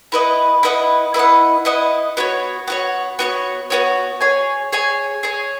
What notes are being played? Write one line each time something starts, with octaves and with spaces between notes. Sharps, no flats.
E4 B4 D#5 F#5
E4 B4 D#5 F#5
E4 B4 D#5 F#5
E4 B4 D#5 F#5
B3 F#4 C#5
B3 F#4 C#5
B3 F#4 C#5
B3 F#4 C#5
G#4 C#5 G#5
G#4 C#5 G#5
G#4 C#5 G#5